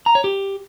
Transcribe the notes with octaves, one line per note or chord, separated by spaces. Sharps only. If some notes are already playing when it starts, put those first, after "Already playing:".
A#5
C#5
G4